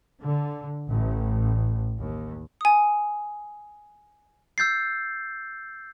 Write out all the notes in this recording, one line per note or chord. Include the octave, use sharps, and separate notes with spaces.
D3
A1
D#2
G#5 D#6
E6 G6 A6 C7